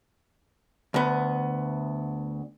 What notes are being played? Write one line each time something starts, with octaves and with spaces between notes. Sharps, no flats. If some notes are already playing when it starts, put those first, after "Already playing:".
D2 B3